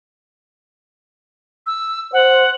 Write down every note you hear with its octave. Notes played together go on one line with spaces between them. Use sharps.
E6
C5 F#5